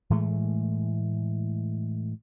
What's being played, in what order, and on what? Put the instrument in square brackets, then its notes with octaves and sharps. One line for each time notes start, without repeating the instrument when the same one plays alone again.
[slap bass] A2 E3 G#3 A3